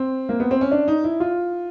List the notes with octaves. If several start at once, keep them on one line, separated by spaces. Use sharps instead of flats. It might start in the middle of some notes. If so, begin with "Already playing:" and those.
Already playing: C4
A#3
B3
C4
C#4
D4
D#4
E4
F4